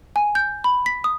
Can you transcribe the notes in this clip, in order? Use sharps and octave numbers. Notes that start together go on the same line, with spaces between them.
G#5
G6
B5
B6
D#6